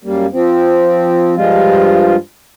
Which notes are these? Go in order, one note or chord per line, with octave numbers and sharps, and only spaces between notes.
F#2 G3 A#3
F3 C4
G2 F3 G3 G#3 F4